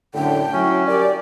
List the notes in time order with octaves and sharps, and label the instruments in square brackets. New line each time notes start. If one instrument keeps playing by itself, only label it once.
[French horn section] F#2 A2 D3 [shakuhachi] G5
[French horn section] F#3 E4 [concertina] C#4
[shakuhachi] G4 [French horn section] A#4 D5